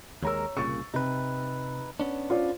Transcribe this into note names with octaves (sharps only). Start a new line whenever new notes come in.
D#2 G#3 A#4 C#5 A#5 E6
C2 A#2 C#3 C#6 A6
C3 D#4 B4
B3 C#4 D4
F4 C5 D5